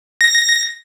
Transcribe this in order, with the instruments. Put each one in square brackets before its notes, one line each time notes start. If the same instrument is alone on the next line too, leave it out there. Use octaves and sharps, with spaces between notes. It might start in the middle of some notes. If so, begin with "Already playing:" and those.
[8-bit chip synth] A#6